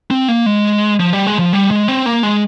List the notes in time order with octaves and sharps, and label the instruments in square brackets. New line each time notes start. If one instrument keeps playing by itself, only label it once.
[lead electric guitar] C4
A#3
G#3
F3
G3
G#3
F3
G3
G#3
C4
A#3
G#3